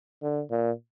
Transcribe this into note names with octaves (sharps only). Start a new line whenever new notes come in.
D3
A#2